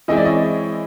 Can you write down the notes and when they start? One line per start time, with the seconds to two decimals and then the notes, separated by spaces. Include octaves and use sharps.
0.08 E3 G#3 C4 E4 D#5
0.17 D5
0.25 C#5 D#5